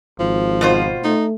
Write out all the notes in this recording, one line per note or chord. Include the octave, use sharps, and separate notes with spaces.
G#1 F3
B2 F4 C5
A3 D#4